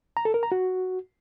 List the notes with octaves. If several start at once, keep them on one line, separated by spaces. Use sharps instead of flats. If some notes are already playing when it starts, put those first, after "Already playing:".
A#5
A4
A#4
A#5
F#4